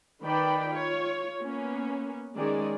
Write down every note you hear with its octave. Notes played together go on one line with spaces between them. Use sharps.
D#3 B4 D5 G5 B5
F4 C#5
A#3 B3 C#4
D#3 G#3 C#4 G#4 D5